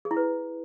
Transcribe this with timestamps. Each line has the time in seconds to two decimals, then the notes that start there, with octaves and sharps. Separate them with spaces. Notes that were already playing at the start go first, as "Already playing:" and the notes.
0.05 G#4
0.11 E4
0.17 B4